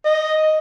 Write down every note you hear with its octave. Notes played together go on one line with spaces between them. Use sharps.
D#5